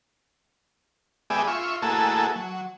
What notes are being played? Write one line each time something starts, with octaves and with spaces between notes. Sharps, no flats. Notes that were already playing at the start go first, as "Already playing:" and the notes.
G#3 B3 G4 G#4 D5 E5
F4 E5 C#6
A3 A#3 E4 F#4 G#4 A4
F#3